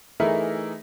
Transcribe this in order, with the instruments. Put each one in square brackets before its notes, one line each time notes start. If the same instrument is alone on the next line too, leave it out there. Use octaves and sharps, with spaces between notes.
[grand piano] E3 A3 D#4 E4 G#4 A#4